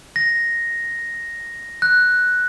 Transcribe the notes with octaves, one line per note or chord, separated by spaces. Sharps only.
A#6
F#6